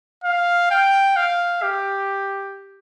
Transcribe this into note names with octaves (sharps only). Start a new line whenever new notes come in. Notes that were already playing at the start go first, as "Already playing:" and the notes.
F5
G5
F5
G4